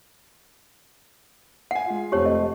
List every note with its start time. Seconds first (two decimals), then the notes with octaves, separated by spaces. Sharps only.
1.71 F#5 G#5 C7
1.86 G#3 F4
2.12 F1 A3 C4 G4 C#5
2.26 D#5